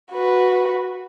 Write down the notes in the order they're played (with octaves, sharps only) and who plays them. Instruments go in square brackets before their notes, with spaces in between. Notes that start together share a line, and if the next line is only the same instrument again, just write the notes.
[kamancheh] F#4 B4